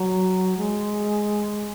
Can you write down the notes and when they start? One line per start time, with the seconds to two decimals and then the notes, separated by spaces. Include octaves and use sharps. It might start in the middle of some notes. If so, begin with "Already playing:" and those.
Already playing: F#3
0.57 G#3